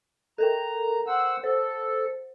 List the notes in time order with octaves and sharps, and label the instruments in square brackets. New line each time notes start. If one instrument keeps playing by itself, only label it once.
[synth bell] A4 A#4 G5 [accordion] A#5
[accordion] C5 F#5 E6
[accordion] A4 [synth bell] C5